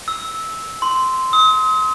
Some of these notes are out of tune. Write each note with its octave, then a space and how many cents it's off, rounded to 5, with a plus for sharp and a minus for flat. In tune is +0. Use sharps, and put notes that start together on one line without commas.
E6 -15
C6 -10
D#6 +40